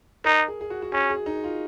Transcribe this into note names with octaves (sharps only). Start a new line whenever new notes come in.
D#4 A#4
G#4
G#4
F#4
F#4
C#4 G#4
G#4
D#4
F4